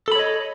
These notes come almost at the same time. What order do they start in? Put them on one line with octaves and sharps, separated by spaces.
A4 B5 C#5 D#5